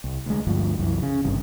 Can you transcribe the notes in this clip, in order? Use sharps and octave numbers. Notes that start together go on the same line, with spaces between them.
C2
D2 G#3
G1 D2 G2 F3
C2 F#2 E3
C#3
G#1 G2 C3